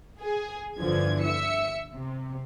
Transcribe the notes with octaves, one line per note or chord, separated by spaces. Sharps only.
G#4
G1 F2 D3 E3 F3 G#6
E5 E6 C#7
C3